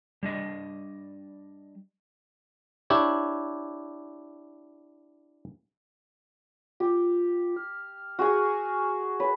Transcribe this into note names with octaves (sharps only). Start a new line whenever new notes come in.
G3 D4 D#5
D4 E4 G4 C#5
F4 G4
F6
F#4 G#4 G#5
B4 C#5